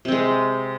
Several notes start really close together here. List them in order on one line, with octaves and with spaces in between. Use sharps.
C3 C4 G#3